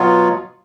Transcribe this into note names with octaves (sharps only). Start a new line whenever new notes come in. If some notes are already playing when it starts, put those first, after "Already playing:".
Already playing: B2 F#3 B3 F4